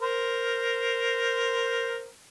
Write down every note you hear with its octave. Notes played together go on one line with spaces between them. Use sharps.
A#4 C5